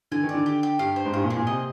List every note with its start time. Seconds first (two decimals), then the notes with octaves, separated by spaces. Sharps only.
0.11 D3 G#5
0.23 D#3
0.29 D5
0.34 D3
0.46 G4
0.63 G4
0.79 G2 F5
0.96 C5
1.05 G#2
1.13 G2 G#4
1.24 A#2
1.30 G#4
1.37 A#2
1.47 C3 D#5